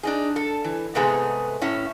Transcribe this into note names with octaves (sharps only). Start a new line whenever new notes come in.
D4 D#4 G#4
A4
E3
G#2 C3 G#3 A3 B3 G#4
A2 C#4 E5